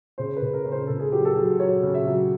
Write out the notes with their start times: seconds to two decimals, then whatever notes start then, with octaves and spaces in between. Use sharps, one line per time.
0.18 C#3 C5
0.36 B4
0.42 C#3
0.54 A#4
0.65 C#3
0.72 C5
0.87 C#3 A4
1.00 G#4
1.12 F#3 G4
1.25 A4
1.36 F#3 G#4
1.59 F#3 C#5
1.83 C#3
1.94 E5
2.07 F#3